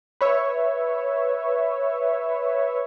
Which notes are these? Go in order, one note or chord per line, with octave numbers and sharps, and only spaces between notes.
B4 C#5 E5